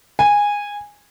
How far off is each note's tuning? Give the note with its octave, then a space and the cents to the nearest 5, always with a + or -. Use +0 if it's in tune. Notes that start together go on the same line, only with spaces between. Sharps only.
G#5 -15